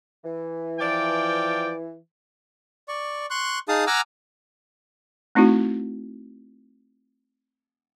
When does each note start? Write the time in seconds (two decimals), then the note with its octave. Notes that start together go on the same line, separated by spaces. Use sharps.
0.24 E3
0.80 F3 D5 G5
2.88 D5 C#6
3.30 C6 C#6 F#6
3.68 D#4 G#4 F5 A5 D#6
3.87 F#5 G#5 A#5 D6 E6 F6
5.35 A3 C4 D#4 E4 F#4